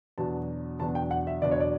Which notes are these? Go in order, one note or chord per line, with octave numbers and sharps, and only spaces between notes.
E2 B2 F#3 B3 D4 A5
E2 B2 F#3 B3 D4 A5
G5
F#5
E5
E2 B2 F#3 B3 D4 D5
C#5
D5